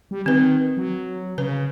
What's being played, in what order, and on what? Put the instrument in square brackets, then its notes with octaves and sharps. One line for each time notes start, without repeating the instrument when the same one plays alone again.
[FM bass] G3
[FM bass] D#3 [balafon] C4 B4
[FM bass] F#3
[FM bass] C#3 [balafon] B4